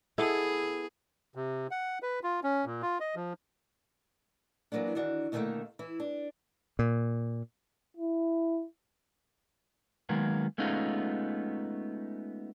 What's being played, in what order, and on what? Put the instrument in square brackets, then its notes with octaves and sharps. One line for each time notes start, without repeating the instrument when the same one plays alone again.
[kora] B3 E4 A4 [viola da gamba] G#4
[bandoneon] C3
F#5
B4
F4
C#4
A#2
F4
D#5
F3
[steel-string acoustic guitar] E3 F#3 A#3 B3 D4
D#3 E3 D4 F#4
B2 D3 D#3 F#3 A3 A#3
E3 E4
D4
[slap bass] A#2
[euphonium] E4
[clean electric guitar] D#3 F#3 G#3 A#3 B3
G#3 A3 B3 C#4 D#4 F4